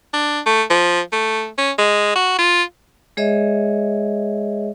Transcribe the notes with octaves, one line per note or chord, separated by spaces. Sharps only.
D4
A3
F3
A3
C#4
G#3
F#4
F4
G#3 G#4 C#5 D#5 E5